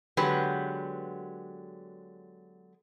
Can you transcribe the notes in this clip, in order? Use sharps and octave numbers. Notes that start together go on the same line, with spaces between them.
D3 F#3 G#3 B3 G4 B4